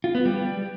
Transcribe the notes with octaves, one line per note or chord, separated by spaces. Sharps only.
F4
B3
G3